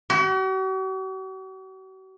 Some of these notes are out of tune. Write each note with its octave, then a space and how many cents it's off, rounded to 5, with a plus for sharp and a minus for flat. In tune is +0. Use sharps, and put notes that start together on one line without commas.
F#4 +45